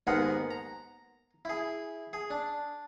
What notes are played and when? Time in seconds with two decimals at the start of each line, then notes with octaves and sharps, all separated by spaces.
0.07 D#2 G#2 B3 G#4 A#4 F#5
0.51 A#5
1.45 E4 G#4
2.13 G#4
2.30 D4